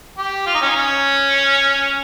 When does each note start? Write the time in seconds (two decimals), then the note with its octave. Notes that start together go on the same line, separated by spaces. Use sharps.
0.18 G4
0.46 F4
0.54 D#4
0.62 C#4
0.69 D#4
0.76 C#4